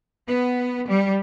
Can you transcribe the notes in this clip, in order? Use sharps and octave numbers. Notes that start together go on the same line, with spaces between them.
B3
G3